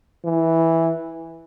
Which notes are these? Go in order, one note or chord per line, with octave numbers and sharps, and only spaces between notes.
E3